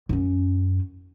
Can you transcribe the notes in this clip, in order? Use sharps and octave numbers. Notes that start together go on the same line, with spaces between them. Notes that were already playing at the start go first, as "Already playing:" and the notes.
F#2 C#4